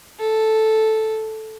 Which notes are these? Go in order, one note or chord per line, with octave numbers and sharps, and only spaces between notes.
A4